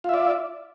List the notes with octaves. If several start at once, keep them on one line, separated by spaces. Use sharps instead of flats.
F4 D5 E5